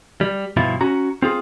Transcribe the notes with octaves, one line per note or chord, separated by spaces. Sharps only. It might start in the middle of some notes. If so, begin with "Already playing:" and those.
G3
G2 B2 F3 E4 F4
C#4 F#4 A#5
C4 F4 G#4